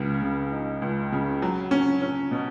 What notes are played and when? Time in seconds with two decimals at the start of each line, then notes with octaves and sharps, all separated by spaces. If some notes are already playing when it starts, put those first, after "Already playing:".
Already playing: C#2 C#3
0.22 C#3
0.52 D#4
0.82 C#2
1.12 C#3
1.42 F#3
1.71 C#4
2.02 C#4
2.31 B2